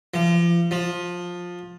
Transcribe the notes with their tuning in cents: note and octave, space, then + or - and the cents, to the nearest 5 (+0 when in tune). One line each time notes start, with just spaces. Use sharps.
F3 -35
F3 +15